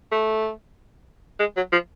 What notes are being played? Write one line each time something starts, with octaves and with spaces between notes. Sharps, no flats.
A3
G#3
F#3
F3